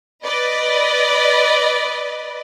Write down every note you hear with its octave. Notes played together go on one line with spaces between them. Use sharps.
B4 D5 D#5